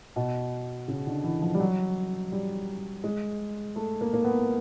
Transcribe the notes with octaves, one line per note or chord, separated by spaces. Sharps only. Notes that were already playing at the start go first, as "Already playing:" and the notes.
B2
C#3
D3
E3
F3
G3
F#3
G3
G#3
A3
A#3
A#3
B3